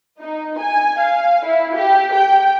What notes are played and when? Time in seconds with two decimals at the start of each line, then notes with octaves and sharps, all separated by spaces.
0.20 D#4
0.59 G#5
0.99 F5
1.45 E4
1.74 G4
2.14 G5